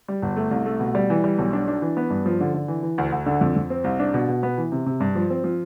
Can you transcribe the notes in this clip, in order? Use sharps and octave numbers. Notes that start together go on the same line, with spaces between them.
G3
G1
A3
C2
A3
B2
G3
E3
G3
B1
D4
D4
E3
B3
G2
F3
D3
D3
E3
E3
D2
D2
D3
F2
F2
C4
C2
D4
B2
B2
B3
E3
C3
C3
G2
F3
C4
F3